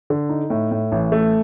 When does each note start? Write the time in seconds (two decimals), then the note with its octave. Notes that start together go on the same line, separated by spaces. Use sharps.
0.10 D3
0.29 D#4
0.50 A2
0.71 A2
0.92 A1
1.12 A3